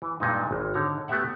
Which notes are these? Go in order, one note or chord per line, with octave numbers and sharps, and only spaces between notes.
E3
G2 A#2 G#3 D#4
G#1
D3 D#4 C#5 A#5
A3 B3 F#4 G4 E5 F#5